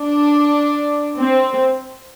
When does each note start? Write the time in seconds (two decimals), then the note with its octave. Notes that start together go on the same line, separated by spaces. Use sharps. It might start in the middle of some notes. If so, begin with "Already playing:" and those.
Already playing: D4
1.18 C4